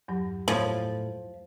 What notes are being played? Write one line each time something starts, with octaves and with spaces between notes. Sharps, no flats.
E2 G2 F#3
A2 F3 C#5 G#6